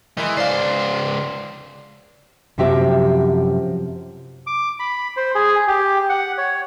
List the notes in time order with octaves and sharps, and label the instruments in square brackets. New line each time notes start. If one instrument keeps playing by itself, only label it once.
[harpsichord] D#3 G#3 [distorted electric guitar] E3
[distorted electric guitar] C#2 C5 [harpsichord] D4 F5
[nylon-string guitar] F#2 C3 F3 F#4 G4 E5
[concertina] D6
B5
C5
G#4
G4
F#5
C#5